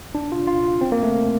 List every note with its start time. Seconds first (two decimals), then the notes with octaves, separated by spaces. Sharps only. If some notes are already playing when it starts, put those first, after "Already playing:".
0.15 D4
0.32 F4
0.47 F4
0.81 C4
0.92 A#3
1.03 A3